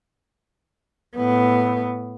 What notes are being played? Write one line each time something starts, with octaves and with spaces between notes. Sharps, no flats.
A2 B3